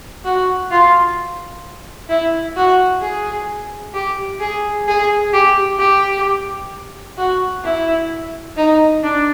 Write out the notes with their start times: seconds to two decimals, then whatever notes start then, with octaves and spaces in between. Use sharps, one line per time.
0.25 F#4
0.71 F4
2.09 E4
2.56 F#4
3.02 G#4
3.94 G4
4.40 G#4
4.88 G#4
5.33 G4
5.79 G4
7.17 F#4
7.64 E4
8.57 D#4
9.03 D4